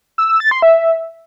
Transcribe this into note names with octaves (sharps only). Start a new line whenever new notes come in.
E6
E6
A6
C6
E5